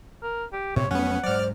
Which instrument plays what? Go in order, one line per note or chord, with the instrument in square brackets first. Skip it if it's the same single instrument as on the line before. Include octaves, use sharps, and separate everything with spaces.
[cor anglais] A#4
G4
[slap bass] A2 [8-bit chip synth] C3 [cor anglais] C#5
[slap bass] F2 F#3 A3 [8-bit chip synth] B3 C#4 [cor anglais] F#5
[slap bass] G#2 F#3 [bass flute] C5 [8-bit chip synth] D5 F6